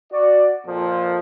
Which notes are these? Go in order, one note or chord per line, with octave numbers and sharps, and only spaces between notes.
F#4 D5
F2 A#2 F3